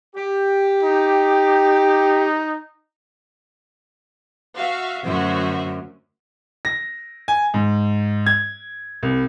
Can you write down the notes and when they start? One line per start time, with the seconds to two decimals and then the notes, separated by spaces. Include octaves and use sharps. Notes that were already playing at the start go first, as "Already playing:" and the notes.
0.16 G4
0.83 D#4
4.57 F#4 E5 F5
5.05 F#2 D3 A3 F#4 C5 E5
6.65 A#6
7.28 G#5
7.54 G#2
8.26 G#6
9.03 C2